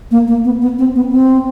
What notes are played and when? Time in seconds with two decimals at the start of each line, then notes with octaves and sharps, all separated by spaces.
0.11 A#3
0.27 A#3
0.45 B3
0.62 B3
0.79 C4
0.96 B3
1.12 C4